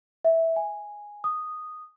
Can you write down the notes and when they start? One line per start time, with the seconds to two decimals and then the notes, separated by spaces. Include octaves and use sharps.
0.25 E5
0.56 G#5
1.24 D#6